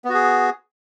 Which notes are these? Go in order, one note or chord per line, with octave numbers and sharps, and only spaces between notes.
B3 F#4 G#4